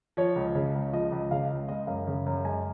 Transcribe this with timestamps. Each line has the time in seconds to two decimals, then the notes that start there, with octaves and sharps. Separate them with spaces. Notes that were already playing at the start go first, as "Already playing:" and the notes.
0.17 F3 C#5
0.36 C#2
0.55 C#3
0.75 C#2
0.92 F3 D#5
1.12 C#2
1.31 C#3 F5
1.50 C#2
1.69 G#3 D#5
1.87 F#2 F5
2.07 C#3
2.26 F#2
2.44 G#3 G#5